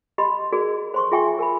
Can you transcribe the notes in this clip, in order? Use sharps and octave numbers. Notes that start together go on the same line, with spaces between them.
G4 D#5 B5 C6
F#4 G#4 A#4 D5
C5 C6 C#6
F4 G#4 E5 G5 G#5 C#6
A#4 G#5 B5